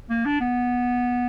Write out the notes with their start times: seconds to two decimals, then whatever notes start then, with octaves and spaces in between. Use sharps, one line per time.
0.10 A#3
0.25 D4
0.40 B3